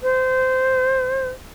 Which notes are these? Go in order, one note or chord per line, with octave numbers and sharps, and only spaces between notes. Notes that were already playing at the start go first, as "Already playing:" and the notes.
C5